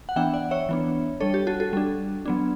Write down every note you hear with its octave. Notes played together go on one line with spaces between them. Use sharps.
F#5
E3 B3 D4 E5 G5
D5 F#5
C#5 E5
E3 B3 D4
G3 D4 A4 C#5
G4
F#4 A4
F#4 A4
G3 D4
F#3 B3 D4